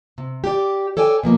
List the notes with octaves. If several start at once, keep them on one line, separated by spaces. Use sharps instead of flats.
C3
G4 D5
A4 C#5 D5 G5 G#5
B2 F3 A#3